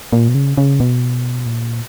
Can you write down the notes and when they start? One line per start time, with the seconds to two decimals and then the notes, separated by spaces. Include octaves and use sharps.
0.13 A#2
0.29 B2
0.35 C#3
0.57 C#3
0.80 B2
1.46 A#2